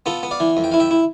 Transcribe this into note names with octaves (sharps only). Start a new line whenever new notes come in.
B3 F4 A4
B3
D5 F5
E3
F2
G5
E4 F5
E5 G5
E4